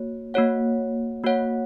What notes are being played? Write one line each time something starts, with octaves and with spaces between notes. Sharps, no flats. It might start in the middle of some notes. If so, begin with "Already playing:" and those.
Already playing: A#3 F#4 C#5
A#3 F#4 C#5 F#5
A#3 F#4 C#5 F#5